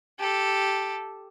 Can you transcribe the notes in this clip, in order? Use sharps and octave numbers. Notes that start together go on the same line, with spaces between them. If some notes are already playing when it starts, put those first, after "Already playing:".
G4 A4